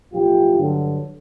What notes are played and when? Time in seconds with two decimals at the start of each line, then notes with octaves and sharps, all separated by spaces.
0.12 B1 A2 F3 A3 F4 G4
0.56 G2 D3 F#3